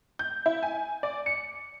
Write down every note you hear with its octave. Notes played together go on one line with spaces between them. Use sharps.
G6
E4
G#5
D5
C#7